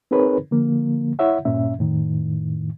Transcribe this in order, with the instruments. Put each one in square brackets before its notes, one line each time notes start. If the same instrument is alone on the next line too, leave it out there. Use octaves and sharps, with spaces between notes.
[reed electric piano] C4 D#4 G#4 A#4 B4 C#5
D3 F3 A#3
E4 C#5 E5 F#5
G2 A#2 C#4 E5
F2 A2 D#3